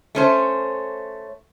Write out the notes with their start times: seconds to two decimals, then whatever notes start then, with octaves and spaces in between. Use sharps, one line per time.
0.15 A3 C#4 C5